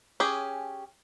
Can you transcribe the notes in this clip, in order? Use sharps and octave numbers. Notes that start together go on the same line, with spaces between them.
C#4 G4 G#4